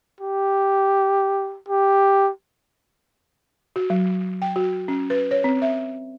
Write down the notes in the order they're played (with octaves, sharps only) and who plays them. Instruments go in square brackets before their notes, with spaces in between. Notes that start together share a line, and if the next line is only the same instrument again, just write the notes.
[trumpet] G4
G4
[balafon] F#4
F#3
G5
F#4
C#4
B4
C#5
C4
E5